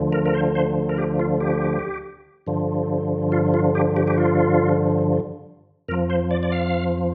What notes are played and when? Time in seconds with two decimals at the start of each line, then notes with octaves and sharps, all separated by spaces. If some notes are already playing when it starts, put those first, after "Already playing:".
Already playing: D2 D3 F3
0.13 A#4
0.26 A#4
0.34 C5
0.55 C5
0.89 A#4
0.98 G4
1.19 F4
1.40 G4
2.47 G2 D3 F3
3.32 F4
3.54 F4
3.75 G4
3.97 G4
4.07 G4
4.18 F4
5.88 F2 A#4
5.91 F3
6.10 C5
6.31 D5
6.43 D5
6.52 F5